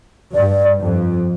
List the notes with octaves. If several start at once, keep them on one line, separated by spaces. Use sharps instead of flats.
G2 D5
F2